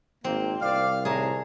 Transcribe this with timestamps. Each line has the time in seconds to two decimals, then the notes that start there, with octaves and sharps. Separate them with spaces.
0.24 G#1 A#3 C4
0.61 C2 D5 F5
1.05 A2 C3 D#3 G#4 A5 A#5